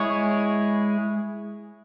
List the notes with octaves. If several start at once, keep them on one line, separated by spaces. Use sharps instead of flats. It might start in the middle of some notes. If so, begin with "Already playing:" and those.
Already playing: G#3 E4 G#4 C#5